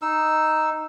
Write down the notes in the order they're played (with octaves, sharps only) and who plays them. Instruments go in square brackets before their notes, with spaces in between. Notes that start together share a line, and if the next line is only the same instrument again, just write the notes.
[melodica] D#4 E6